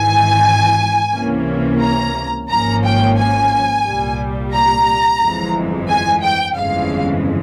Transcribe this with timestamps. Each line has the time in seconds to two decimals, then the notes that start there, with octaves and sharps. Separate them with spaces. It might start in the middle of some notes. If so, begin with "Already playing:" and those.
Already playing: G#1 G#2 E3 G#5
1.13 C#2 C3 E3 A#3 C#4
1.82 A#5
2.50 G#1 G#2 F3 A#3 C#4 A#5
2.83 G5
3.17 G#5
3.85 C2 A#2 G3
4.53 A#5
5.21 G1 F2 E3 G#3
5.89 G#5
6.22 G5
6.57 G1 F2 C#3 E3 G#3 F5